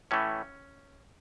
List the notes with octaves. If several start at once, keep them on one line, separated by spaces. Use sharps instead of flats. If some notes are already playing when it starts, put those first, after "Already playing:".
A2 E3 A3 C#4